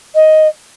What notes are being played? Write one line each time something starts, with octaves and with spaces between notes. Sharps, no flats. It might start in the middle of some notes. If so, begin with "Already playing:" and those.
D#5